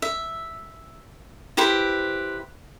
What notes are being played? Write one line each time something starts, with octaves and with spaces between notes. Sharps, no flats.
E5
E4 G4 B4 C5